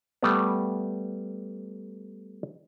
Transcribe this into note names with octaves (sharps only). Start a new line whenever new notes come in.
G3 A3 B3